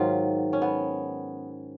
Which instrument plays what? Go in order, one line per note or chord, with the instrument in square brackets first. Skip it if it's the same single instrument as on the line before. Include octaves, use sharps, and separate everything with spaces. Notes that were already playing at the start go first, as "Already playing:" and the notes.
Already playing: [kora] G#2 D#3 F#3 F4
C#4
B3